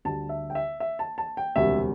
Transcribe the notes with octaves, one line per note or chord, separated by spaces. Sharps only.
D2 D3 G3 A5
E5
G5
E5
E5
A5
A5
G5
E1 D2 C3 G3 E5